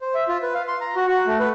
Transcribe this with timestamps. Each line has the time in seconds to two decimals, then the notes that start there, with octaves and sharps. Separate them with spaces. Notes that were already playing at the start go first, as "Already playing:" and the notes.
0.01 C5
0.15 E5
0.28 F4
0.43 B4
0.54 F5
0.68 C6
0.81 A#5
0.95 F#4
1.08 F#4
1.27 A3
1.40 B4